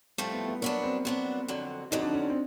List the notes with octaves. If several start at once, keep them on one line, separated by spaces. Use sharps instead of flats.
A2 F3 G3 A3 C4
B3
B3
F#3 A#3 B3 D4
C4
F#3 B3 C4 D4
F2 D3 F#3
F2 D3 F#3 D#4
D4
C#4
C4